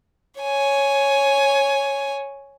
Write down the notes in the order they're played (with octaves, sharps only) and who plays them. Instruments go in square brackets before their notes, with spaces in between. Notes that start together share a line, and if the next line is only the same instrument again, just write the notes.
[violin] C#5 G#5